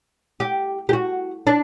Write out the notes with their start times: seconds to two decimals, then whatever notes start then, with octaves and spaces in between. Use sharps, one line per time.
0.40 G4
0.89 G4
0.93 F#4
1.47 D4